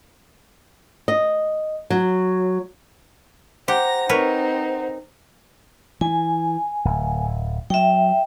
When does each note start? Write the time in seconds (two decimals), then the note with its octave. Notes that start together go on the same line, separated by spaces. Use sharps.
1.08 D#5
1.90 F#3
3.68 G4 C5 F#5 A#5 A#6
4.09 C4 D#4 A#4 B4 C#5
6.01 E3 G#5
6.85 D1
7.70 F#3 E5 G5